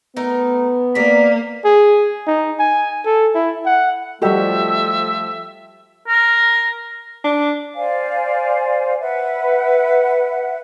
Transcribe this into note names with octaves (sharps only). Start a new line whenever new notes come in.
A3 B3 D#4 A#4
A#3 A#4 D5 B6
G#4
D#4
G#5
A4
E4
F#5
F3 G3 A3 F#4 G4 A4 D#5 E5
A#4
D4
C5 D5 F5 G#5
B4 E5 F#5